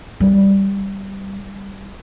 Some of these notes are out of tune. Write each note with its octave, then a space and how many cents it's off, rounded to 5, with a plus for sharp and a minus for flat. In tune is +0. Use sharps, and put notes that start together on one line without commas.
G3 +0